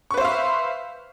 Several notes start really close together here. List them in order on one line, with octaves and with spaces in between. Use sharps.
C#6 B4 C5 E5 F5